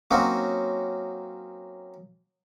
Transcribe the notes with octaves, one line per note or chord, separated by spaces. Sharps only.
F#3 A#3 C4 C#4 D#4 F#4